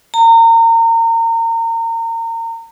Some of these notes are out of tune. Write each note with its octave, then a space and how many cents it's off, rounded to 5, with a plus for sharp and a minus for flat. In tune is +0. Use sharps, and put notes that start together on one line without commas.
A#5 -30